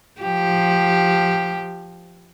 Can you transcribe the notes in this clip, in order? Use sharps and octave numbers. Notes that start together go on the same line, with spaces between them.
F3 G4